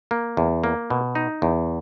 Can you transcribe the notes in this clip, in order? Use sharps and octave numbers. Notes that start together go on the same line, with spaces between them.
A#3
E2
A#3
B2
D#4
E2